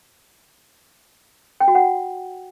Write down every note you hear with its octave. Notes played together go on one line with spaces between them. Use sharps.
G5
F#4
F#5